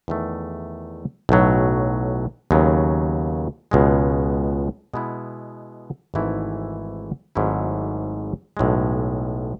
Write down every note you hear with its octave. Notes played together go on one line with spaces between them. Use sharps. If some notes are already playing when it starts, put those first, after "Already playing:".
E2 D#3 A3
B1 A2 F#3
D#2 C#3 F#3 B3
C#2 B2 G#3
B2 G#3 B3 E4
G#1 G#2 E3 A3 E4
G#1 G#2 F#3 A3 E4
B1 A2 G#3